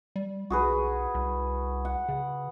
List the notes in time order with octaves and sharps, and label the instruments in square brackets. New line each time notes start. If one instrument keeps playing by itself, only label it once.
[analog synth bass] G3
[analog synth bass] B1 [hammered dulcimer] F#4 G#4 B4
[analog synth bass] C2
[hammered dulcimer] F#5
[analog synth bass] C#3